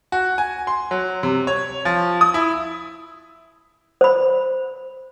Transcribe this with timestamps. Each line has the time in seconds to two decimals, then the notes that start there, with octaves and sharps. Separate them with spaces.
0.12 F#4
0.38 G#5
0.67 C6
0.91 F#3
1.23 C3
1.47 C#5
1.85 F3
2.21 D#6
2.34 E4
4.01 C5 B5